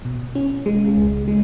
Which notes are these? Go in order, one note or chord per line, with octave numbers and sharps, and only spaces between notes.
B2
C#4
G#3
C#2
G#3